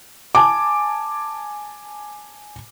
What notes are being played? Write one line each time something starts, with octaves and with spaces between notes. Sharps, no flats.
G#5 A5 D6